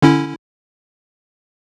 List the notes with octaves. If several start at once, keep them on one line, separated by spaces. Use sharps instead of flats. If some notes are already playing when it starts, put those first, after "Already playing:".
D3 C#4 E4